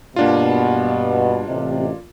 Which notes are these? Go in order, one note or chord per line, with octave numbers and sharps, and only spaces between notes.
G2 B2 A#3 D4 F4
A1 C3 D#5